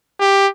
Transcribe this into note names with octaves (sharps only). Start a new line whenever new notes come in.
G4